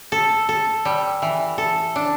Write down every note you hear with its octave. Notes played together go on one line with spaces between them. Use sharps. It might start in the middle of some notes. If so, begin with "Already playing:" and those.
A4
A4
G3
E3
A4
D4